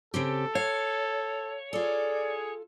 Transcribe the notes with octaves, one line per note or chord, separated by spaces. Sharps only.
C#3 C4 G4 A4
C#5 F5
F4 G#4 A4 D5